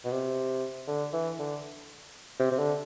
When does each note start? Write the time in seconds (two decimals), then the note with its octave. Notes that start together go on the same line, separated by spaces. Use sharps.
0.05 B2
0.12 C3
0.88 D3
1.13 E3
1.39 D3
2.40 C3
2.51 C3
2.59 D3